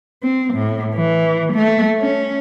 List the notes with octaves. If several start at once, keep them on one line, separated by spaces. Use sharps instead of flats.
C4
A2
E3
A3
C#4